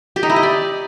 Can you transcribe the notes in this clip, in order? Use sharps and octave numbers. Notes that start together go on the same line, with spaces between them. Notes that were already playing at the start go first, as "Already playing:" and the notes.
G4
D#4
E4
D#5
D5